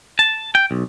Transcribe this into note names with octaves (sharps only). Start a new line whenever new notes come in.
A5
G5
B1